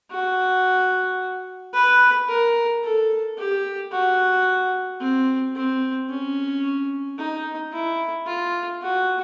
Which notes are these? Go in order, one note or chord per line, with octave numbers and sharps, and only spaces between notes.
F#4
B4
A#4
A4
G4
F#4
C4
C4
C#4
D#4
E4
F4
F#4